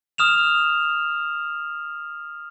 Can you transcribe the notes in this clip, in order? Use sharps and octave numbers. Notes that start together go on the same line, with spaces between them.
D#6 F6 E7 F7